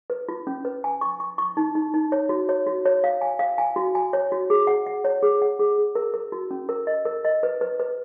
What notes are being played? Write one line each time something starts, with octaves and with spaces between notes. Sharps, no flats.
B4
F4
C#4
B4
G#5
C#6
C#6
C#6
D#4
D#4
D#4
C#5
F#4
C#5
F#4
C#5
F5
G#5
F5
G#5
F#4
G#5
C#5
F#4
G#4
F#5
F#5
C#5
G#4
F#5
G#4
G#4
A#4
A#4
F#4
C#4
A#4
D#5
A#4
D#5
B4
B4
B4